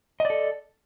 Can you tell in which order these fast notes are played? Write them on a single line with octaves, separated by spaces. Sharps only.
D#5 D5 A4